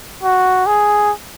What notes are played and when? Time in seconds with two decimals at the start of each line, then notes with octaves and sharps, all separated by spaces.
0.23 F#4
0.67 G#4